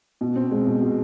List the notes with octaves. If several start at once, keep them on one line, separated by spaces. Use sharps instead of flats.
B2
C4
G#3
B2
B2